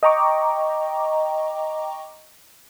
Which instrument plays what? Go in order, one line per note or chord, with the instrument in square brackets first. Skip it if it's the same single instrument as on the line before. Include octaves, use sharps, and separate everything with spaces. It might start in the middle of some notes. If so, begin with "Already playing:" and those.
[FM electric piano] D#5 G5 A#5 C#6 D6